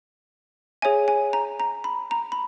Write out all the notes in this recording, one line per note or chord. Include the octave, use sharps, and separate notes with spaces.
G#4 C#5 E5 G#5
G#5
A#5
A#5
B5
A#5
B5